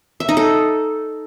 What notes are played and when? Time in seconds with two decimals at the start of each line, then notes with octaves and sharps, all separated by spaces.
0.20 E5
0.29 D#4
0.37 A4